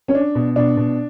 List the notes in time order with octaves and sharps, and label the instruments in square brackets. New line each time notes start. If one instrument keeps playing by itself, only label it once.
[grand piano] C#4 C#5
D4
B2
B2 D4 D5
B2